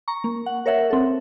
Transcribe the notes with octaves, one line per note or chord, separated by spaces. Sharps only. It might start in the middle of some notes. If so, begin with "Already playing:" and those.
A#5 C#6
A#3
F#5
A#4 C#5 E5 F#5
C4 A4